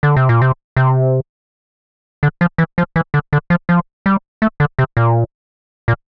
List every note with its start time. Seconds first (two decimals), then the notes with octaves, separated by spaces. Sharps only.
0.03 D3
0.17 C3
0.29 A#2
0.42 C3
0.76 C3
2.23 D3
2.41 F3
2.58 E3
2.78 F3
2.96 E3
3.14 D3
3.33 D3
3.50 F3
3.69 F3
4.06 G3
4.42 A3
4.60 D3
4.79 C3
4.97 A#2
5.88 A#2